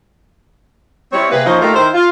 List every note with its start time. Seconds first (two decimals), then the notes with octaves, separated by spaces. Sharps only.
1.12 G3 C4 E4 C#5
1.30 C3 A#3 G#4 B4
1.45 F3 A#3 C#4 D#4 F4 C5
1.61 A3 A#3 D#4 F4 G4 A#4
1.74 D#3 E4 A#4 C5
1.94 F4